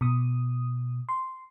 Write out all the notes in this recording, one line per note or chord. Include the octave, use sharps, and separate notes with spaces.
B2 D#6
C6